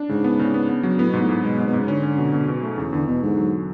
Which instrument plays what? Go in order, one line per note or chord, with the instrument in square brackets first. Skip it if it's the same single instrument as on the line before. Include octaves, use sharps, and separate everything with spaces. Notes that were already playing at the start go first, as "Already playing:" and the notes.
Already playing: [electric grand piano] D4
[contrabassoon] G#2 [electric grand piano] C#3
[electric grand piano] B3
C#3
B3
B3
F#3
[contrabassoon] A2 [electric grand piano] B3
[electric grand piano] G#2 [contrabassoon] B2
[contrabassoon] A2
[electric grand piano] G#2
[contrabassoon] B2 [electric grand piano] G#3
[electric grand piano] G#2
[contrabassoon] B2
[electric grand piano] G#2 [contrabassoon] C#3
[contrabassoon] D3 [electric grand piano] C#4
[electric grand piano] C#4
B2
B2
B2
A3
[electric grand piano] E2 [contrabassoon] C#3
[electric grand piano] E2 [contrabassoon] D3
[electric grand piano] E2 [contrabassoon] B2
[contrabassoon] G#2 [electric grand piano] D3
[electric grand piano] F#3